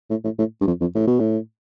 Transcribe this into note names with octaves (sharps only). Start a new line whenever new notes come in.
A2
A2
A2
G2
F2
F2
A2
B2
A2